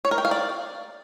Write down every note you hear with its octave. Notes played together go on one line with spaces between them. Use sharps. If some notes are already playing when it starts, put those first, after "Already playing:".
C#5
A#4
G5
F5
D5